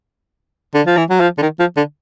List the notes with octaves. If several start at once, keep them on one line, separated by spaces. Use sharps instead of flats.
D3
F3
E3
F#3
F3
D3
D#3
F3
D3